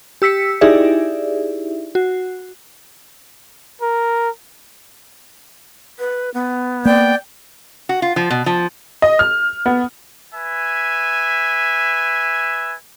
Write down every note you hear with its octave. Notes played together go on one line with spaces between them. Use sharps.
G4 E6 B6 C#7
D#4 E4 G4 G#4 D5 E5
F#4
A#4
B4
B3
A#3 D5 G5
F#4
F4
F3
B2
F3
D#5
F6
B3
B4 E5 G#5